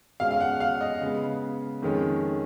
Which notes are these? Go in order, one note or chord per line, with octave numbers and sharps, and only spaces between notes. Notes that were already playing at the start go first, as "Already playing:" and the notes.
B2 G#3 C#4 F5
F5
F#5
F5
D#5
C#3 G#3 B3
F2 D#3 G#3 C#4